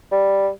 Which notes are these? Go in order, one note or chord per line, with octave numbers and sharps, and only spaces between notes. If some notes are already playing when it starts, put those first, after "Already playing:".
G3